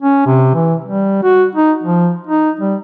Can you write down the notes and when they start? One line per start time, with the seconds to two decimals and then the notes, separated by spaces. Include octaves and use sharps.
0.02 C#4
0.27 C3
0.55 E3
0.84 G3
1.23 F#4
1.55 D#4
1.83 F3
2.27 D#4
2.60 G3